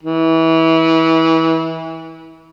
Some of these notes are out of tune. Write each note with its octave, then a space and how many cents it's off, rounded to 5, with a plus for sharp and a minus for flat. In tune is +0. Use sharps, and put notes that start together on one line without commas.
E3 -25